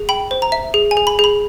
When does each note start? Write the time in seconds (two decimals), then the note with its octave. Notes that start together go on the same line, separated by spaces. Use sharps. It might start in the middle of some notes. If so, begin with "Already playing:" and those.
Already playing: G#4
0.09 G5 B5
0.31 C5
0.42 A#5
0.52 E5
0.74 G#4
0.91 G#5
0.97 G#4
1.07 B5
1.19 G#4 B5